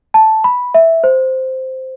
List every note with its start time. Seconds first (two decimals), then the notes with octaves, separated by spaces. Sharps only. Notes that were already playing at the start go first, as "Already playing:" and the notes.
0.14 A5
0.44 B5
0.74 E5
1.04 C5